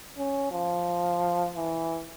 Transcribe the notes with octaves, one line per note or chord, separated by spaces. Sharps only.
C#4
F3
E3